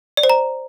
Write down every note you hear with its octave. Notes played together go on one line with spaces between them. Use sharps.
D5
C5
A#5